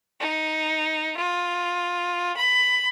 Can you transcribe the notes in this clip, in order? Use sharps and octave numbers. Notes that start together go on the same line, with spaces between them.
D#4
F4
B5